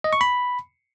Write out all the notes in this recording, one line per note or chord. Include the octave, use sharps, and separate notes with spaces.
D#5
C#6
B5